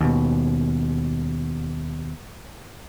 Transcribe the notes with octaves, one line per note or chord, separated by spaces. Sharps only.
D#2 B2